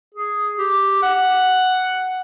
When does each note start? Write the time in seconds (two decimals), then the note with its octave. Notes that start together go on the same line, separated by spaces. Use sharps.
0.15 G#4
0.59 G4
1.03 F#5